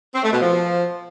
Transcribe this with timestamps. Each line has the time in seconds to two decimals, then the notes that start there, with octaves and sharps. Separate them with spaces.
0.15 C4
0.24 A3
0.32 B2
0.41 F3